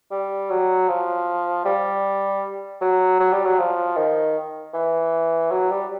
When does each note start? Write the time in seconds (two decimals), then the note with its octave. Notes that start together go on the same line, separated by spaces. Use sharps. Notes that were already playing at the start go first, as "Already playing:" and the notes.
0.11 G3
0.50 F#3
0.88 F3
1.65 G3
2.81 F#3
3.20 F#3
3.32 G3
3.45 F#3
3.58 F3
3.97 D#3
4.74 E3
5.51 F#3
5.70 G3